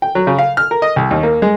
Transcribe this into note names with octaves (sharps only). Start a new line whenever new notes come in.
G5
F#3
C#3
F5
F6
A#4
D#5
C2
D#2
A#3
G#3